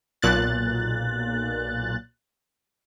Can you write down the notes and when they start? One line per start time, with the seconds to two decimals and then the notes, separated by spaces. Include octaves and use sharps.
0.22 B1 A#2 F#6 A6